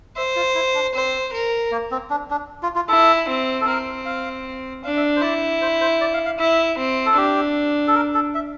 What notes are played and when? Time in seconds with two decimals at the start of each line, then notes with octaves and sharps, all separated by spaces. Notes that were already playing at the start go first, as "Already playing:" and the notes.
0.16 C5 E5
0.36 F4
0.55 E4
0.74 D4
0.94 C4 C5
1.33 A#4
1.71 A#3
1.91 C4
2.10 D4
2.31 D4
2.63 F4
2.76 F4
2.88 E4 A4
3.28 C4
3.61 A4
3.67 C4 A#4
4.06 F5
4.84 D4 F5
4.97 E5
5.16 C5
5.22 E4 D5
5.62 C5
5.81 C5
6.01 D5
6.14 F5
6.26 F5
6.39 E4 E5
6.78 C4
7.06 A4
7.17 D4 G4
7.87 A4
7.95 A#4
8.14 A4
8.34 E5